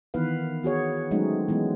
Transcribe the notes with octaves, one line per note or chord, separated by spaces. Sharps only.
D#3 E3 B3 B4 F5
B3 F#4 G#4 C#5
F#3 G#3 A3 C4 C#4 D#4
E3 G#3 B3